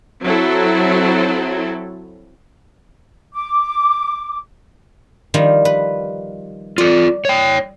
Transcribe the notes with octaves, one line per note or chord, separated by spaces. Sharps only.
F#3 C4 E4 A4
D6
D#3 F3 G3
B4
F4 A4 D5
C#5 G5